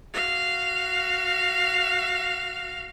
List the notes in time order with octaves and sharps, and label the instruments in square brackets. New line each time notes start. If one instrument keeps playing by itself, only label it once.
[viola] F#4 F5